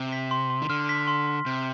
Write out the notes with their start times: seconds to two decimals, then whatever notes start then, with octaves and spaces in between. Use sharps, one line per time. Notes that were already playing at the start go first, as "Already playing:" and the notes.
Already playing: C3
0.13 B6
0.31 C6
0.50 C6
0.62 D#3
0.69 D3 F6
0.89 B6
1.07 C6
1.27 C6
1.46 C3 G6